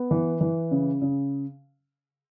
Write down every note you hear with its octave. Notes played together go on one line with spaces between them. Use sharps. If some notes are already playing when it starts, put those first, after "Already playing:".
Already playing: B3
E3
E3
C#3
C#3